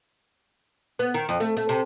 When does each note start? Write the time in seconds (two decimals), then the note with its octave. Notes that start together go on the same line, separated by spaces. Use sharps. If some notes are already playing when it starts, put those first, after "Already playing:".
0.99 B3
1.14 D#3
1.29 F2
1.40 A3
1.57 A3
1.69 C3